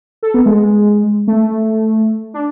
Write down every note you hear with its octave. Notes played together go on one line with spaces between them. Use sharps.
A4
B3
G#3
A3
D4